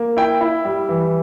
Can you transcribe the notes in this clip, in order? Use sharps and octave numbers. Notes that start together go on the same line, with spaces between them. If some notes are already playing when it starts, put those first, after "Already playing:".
Already playing: A#3
E4 G5
E4
G3
E3